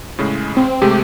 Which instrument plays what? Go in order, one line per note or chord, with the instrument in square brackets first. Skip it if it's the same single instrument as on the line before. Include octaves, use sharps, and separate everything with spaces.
[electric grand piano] A2 C#3 G#3
[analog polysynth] C4
[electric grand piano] C3 G#3 A3 [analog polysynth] G4